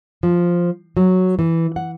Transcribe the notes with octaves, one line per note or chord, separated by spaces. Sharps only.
F3
F#3
E3
F#5